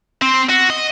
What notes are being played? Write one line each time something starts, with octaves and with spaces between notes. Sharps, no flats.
C4
F#4
D#5